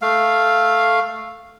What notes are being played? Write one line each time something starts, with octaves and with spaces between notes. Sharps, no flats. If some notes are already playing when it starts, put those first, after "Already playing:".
A3 F5